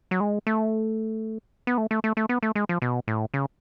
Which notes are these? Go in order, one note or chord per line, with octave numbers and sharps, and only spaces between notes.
F#3
G#3
A3
B3
A3
A3
A3
A3
B3
A3
G#3
F3
B2
A2
C#3